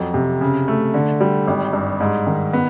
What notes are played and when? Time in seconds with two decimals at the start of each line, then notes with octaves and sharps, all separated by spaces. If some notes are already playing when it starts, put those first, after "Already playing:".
Already playing: F2 F#3
0.14 C3
0.41 C#3
0.68 A3
0.94 D3
1.21 G3
1.47 G#1
1.73 G2
2.00 G#2
2.27 D#3
2.53 B3